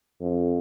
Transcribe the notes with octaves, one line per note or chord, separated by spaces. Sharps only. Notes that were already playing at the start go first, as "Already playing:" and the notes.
F2